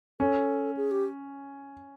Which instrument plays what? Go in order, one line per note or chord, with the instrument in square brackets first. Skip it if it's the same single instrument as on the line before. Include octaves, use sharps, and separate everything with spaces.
[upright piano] C#4 [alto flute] A4
[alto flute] G#4
G4